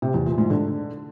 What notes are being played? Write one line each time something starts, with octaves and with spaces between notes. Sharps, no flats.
C3
E2
A#2
G#2
D3